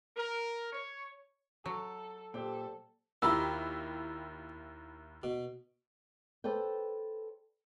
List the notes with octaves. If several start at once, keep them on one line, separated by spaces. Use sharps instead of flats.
A#4
C#5
F#3 A4
A#2 G4 A4 C5 G5
D#2 E4 F4 G4 C5 A#5 B5 E6
B2
A4 B4 C5 D5 G5